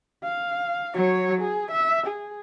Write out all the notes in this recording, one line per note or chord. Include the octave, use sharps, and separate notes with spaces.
F5
F#3 C#5
G#4
E5
G#4